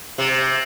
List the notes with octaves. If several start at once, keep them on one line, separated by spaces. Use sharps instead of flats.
C3